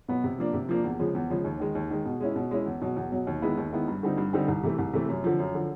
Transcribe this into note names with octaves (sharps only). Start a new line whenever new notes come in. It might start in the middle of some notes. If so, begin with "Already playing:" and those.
B2 F#3 B3
C3
F3 A#3 D4
C3
F3 A#3 D4
E2
C#3 F3 G#3
E2
C#3 F3 G#3
D#2
D#3 G#3
D#2
D#3 G#3
B2
G#3 C#4 E4
B2
G#3 C#4 E4
E2
B2 F#3
E2
B2 F#3
D#2
D#3 G#3 B3 E4
D#2
D#3 G#3 B3 E4
G2
D3 G3 C4 D#4
G2
D3 G3 C4 D#4
C2
C3 E3 A3
C2
C3 E3 A3
F#2
D3 F3
F#2
D3 F3